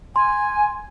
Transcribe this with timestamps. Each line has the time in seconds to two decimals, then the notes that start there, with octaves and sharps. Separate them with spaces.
0.16 G#5 C6